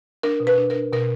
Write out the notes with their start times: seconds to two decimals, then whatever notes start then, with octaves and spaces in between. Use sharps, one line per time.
0.23 D4 A#4
0.40 B2
0.47 B4
0.58 D4
0.70 A#4
0.75 D4
0.92 B2 A#4